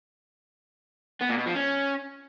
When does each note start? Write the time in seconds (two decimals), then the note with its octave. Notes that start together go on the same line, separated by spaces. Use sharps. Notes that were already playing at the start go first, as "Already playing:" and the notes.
1.21 B3
1.30 A#2
1.39 B2
1.47 F3
1.56 C#4